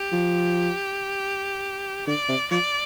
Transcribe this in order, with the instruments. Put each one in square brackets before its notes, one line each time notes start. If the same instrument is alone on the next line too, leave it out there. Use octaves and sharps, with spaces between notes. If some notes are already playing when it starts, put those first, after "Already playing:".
Already playing: [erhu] G4
[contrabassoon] F3
[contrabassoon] D3 [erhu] D5
[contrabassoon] C3
[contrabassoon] F3 [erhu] D5